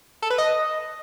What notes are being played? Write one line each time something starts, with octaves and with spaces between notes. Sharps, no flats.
A4
B4
D#5